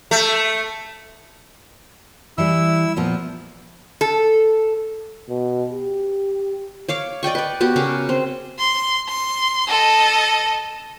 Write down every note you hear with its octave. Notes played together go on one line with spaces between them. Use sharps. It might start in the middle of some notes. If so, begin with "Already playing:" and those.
A3
E3 G3 E4 E6
A#2 F3 B3
A4
B2
G4
C#5 F5 D6
D5 D#5 G5 C#6
B4 D5
B3 F#4 G4
C#3 G#4 A#4 D6
C4
C6
C6
A4 D#5